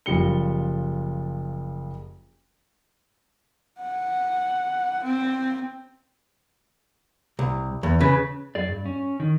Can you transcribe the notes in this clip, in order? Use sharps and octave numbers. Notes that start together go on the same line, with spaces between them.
F#1 F3 G3 C#7 G7
F#5
C4
C2
E2
C#3 B4
F#2 G#4 D5
G2
C#4
D#3